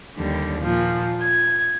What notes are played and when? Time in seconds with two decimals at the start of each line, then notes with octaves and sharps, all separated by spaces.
0.17 D#2 D3 G3
0.61 A#2 F3
1.22 G#6